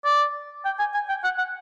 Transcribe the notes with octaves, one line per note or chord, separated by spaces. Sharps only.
D5
G5
G#5
G#5
G5
F#5
F#5